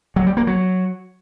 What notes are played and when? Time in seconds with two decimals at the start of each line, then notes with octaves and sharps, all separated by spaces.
0.16 F#3
0.27 G3
0.37 A#3
0.47 F#3